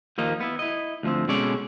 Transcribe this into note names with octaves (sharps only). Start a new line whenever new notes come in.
D#2 F3 A#3 D#5
B3 E4
E4 D#5
D2 F3 C4
B2 G#3 C#4 A4 D5